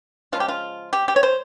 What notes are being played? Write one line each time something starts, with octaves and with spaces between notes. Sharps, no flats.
C#3 F3 G#3 F4
G4
F4
G4
G4
C#5
C5